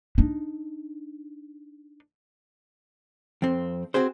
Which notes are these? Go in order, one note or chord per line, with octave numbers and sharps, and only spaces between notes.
D4 D#4
F2 C4
C4 F#4 G#4 C5